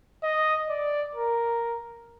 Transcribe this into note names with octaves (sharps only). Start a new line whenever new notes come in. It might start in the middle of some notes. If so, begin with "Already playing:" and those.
D#5
D5
A#4